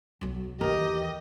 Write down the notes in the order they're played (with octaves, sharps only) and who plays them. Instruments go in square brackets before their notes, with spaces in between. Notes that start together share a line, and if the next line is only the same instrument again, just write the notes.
[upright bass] B1 F#3
[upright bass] D#2 E3 [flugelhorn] G4 [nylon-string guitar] A#4 [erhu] D#5